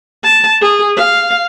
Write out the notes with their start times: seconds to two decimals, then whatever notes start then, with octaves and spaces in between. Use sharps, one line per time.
0.24 A5
0.61 G#4
0.97 F5